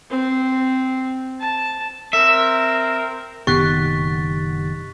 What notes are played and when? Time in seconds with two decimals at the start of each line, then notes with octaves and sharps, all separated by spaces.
0.10 C4
1.41 A5
2.13 C4 A#4 E5
3.47 F#1 B2 D#3 G4 C#6 F#6 A6 B6